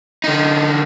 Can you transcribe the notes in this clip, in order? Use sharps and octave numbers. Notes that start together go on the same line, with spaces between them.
D3 D#4